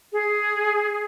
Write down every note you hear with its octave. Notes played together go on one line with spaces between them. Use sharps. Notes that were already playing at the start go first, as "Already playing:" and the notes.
G#4